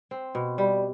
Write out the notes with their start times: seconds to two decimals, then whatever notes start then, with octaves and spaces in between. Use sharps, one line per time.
0.11 C4
0.35 B2
0.58 G3